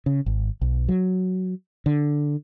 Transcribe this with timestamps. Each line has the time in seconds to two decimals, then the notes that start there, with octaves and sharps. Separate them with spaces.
0.06 C#3
0.26 G#1
0.61 B1
0.89 F#3
1.86 D3